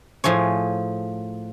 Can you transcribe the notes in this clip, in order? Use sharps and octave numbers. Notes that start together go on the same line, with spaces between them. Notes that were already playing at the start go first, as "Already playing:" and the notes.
A2 F3 G#4 C#5